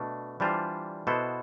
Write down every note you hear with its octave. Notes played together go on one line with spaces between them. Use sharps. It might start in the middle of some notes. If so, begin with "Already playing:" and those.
Already playing: B2 A3 D4
E3 G3 D4 F4 C5
B2 B3 E4 A4 C5